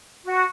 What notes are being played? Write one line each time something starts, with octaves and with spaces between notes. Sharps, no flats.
F#4